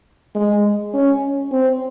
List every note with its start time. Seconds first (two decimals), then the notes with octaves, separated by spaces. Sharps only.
0.35 G#3
0.94 C#4
1.51 C4